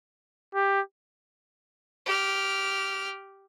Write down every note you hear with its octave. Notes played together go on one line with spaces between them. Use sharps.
G4
G4 F6